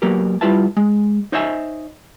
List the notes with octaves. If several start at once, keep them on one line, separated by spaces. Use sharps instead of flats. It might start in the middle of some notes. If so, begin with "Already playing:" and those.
F#3 A#3 B3 G4 A#4
G3 E4 F4 B4 E5 A5
G#3
D#4 C5 C#5 D#5 E5 G#5